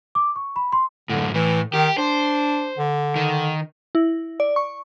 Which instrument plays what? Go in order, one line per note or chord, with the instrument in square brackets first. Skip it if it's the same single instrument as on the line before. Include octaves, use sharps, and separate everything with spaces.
[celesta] D6
C#6
B5
C6
[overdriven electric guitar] F#2 A2 [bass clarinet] D3
[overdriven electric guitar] A2 [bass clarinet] E3
[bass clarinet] D#3 [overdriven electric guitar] G4
[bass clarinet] D4 [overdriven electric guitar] C5
[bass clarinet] D3
[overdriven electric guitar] D#3
[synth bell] E4
D5
C#6